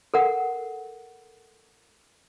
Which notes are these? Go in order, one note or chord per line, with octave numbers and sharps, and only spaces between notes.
A4 A#4 F#5